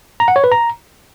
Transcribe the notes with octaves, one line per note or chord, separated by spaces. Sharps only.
A#5
F#5
C#5
B4
A#5